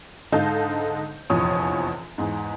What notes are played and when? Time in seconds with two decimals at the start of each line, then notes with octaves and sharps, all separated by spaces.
0.32 G#2 D3 D#4 F5 A5 G6
1.30 F1 A#1 E2 F3 C#5 D#6
2.18 E2 G#2